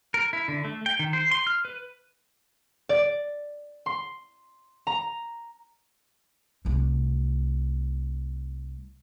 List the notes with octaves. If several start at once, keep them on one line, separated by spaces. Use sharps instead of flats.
A#4
E4
D3
A3
G5
D#3
C5
C6
F6
B4
D5
C6
A#5
C2 A3